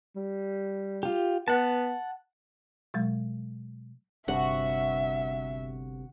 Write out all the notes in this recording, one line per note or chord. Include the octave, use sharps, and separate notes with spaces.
G3
F4 G4
B3 F#5 A5
B2 F#3 G#3
G1 G2 C3 F#4 E5